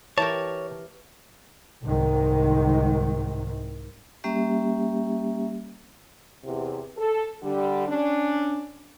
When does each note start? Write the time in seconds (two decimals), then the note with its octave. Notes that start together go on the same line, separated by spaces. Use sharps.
0.18 E3 G4 A#4 C#5 A5
1.82 C2 G#2 D#3
4.24 G3 A#3 C#4 G4 E5
6.44 E2 C3
6.98 A4
7.43 D3 G3
7.88 C#4 D4